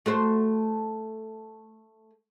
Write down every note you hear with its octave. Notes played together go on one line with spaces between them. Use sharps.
A3 F#4 C5